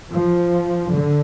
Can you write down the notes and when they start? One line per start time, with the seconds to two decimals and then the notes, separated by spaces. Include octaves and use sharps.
0.12 F3
0.93 D3